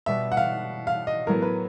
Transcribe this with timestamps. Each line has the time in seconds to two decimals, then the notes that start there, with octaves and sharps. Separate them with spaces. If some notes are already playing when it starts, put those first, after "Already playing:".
0.06 B2 G3 B3 E5
0.32 F#5
0.37 F5
0.87 F5
1.07 D#5
1.27 A2 F#3 B3 A#4
1.42 B4